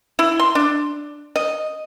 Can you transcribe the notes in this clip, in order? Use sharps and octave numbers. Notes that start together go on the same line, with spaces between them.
E4
C6
D4
D#5